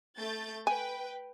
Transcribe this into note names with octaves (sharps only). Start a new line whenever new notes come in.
A3 G6 A6
B4 G5 G#5